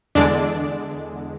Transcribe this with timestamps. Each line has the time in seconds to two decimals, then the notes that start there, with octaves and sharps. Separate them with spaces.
0.15 E2 D3 G#3 D4 D5